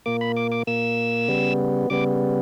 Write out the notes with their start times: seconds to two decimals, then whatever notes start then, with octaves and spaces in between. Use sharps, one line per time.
0.06 A#2 A#3 D6
0.21 B5
0.37 D6
0.52 D6
0.67 A#2 A#3 E6
1.28 C#3 G3 B3
1.90 C#3 G3 B3 D6